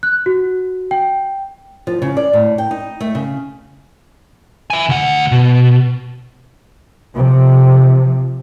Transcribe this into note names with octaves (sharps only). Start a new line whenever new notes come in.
F#6
F#4
G5
F3
C#3
D5
A2
G5
D#4
A3
C#3
E5 G#5
D2 F#5
B2
C3 F3